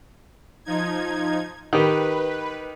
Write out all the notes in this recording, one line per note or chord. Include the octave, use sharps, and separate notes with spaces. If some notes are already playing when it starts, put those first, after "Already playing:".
F3 D#4 G#6
D#3 G4 B4